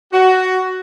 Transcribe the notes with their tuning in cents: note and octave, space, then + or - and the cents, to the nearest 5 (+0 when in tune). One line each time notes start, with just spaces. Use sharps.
F#4 +10